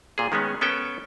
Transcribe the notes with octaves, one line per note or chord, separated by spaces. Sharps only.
A#2 G#4
D#3 G#3 B3 C#4
B3 C#4 A4 G5